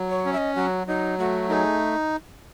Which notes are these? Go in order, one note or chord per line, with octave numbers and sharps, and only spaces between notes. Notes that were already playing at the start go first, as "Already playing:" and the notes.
Already playing: F#3
C#5
C#4
E5
D#5
F#3 F#4
F#3 D#4
A3 F#4
D#4 G#4 A#4